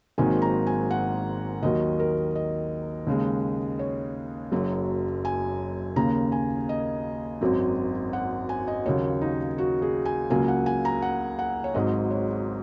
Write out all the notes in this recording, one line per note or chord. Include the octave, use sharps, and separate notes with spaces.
G#1 G#2 D#3 F#3 A#3 G#5
A#5
G#5
F#5
D#2 D#3 F#3 D#5
A#4
D#5
D#2 C#3 G#3
C#5
F#1 F#2 F#3
G#5
D#2 C#3 A#3 A#5
G#5
D#5
G#1 F#2 F#3
F#5
G#5
D#5
D#2 C#3 F#3 A#3 C#5
D#4
F#4
G#4
G#5
C#2 C#3 F#3 A#3 G#5
F#5
G#5
A#5
F#5
F#5
C#5
G#1 G#2 F#3 D#5
C#5